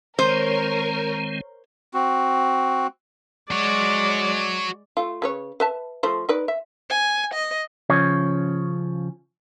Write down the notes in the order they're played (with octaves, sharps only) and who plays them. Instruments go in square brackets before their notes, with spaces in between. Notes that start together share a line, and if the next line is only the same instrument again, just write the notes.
[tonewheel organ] D#3 G#3 C4 [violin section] A#4 C#5 [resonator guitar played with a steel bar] C5
[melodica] C4 F#4
[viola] G#3 D5 [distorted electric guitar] F#4 C#5
[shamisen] A3 F4
C#3 B4 C#5
B4 E5 A5
F3 A3 C5
D#4 B4 D5
E5
[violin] G#5
D#5
[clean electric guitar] C#3 F3 C#4 C#5